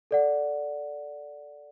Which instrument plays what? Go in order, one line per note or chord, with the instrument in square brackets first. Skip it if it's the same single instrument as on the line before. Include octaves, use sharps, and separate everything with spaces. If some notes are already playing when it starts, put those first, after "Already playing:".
[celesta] A4 D5 F#5